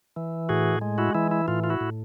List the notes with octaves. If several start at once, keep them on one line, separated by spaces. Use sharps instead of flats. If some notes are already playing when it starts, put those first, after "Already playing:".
E3
A2 F#4 G#4
G#3
E4 F#4
E3 E4
E4
A2 F4
F4
E4 F#4
A2